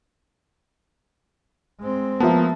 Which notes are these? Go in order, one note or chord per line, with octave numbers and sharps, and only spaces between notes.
G#3 C4
F3 A#3 B3 E5 A5